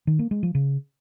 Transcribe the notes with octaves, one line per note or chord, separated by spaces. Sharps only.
D#3
A#3
G#3
F3
C#3